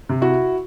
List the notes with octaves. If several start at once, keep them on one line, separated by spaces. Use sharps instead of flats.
C3
E4 F#4